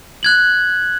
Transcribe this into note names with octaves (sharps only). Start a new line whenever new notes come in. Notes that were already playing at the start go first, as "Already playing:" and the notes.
F#6 G#6 F#7